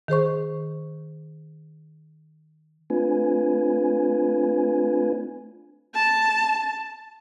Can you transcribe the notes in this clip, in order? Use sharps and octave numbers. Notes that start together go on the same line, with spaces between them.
D#3 G#4 C5 C#6
A3 C4 D4 F4 B4 G#5
A5